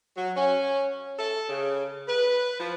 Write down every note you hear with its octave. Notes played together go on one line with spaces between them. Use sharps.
F#3
C#4
A4
C#3
B4
F3